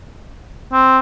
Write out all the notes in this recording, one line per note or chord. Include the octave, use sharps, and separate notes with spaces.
C4